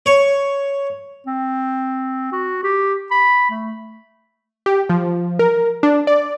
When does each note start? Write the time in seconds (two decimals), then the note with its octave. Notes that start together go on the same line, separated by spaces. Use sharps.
0.06 C#5
1.27 C4
2.33 F#4
2.64 G4
3.11 B5
3.50 A3
4.66 G4
4.89 F3
5.39 A#4
5.83 D4
6.07 D5